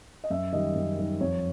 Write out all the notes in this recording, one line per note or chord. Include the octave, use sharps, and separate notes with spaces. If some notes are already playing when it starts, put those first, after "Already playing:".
D#5
F#2 E5
D#3 G3 D#5
F#2
D#3 G3
F2 C#5